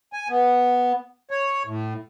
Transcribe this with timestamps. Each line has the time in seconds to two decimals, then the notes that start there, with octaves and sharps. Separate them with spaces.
0.13 G#5
0.29 B3
1.31 C#5
1.66 A2